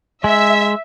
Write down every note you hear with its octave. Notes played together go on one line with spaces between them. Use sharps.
G#3 E5